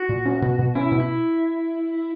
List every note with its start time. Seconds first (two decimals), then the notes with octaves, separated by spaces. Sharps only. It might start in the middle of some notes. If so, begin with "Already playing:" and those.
Already playing: F#4
0.09 A#2
0.25 C#4
0.42 B2
0.59 B2
0.75 C#4 E4
0.92 B2
1.00 E4